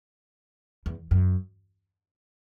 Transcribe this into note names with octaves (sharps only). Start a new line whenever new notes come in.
E2
F#2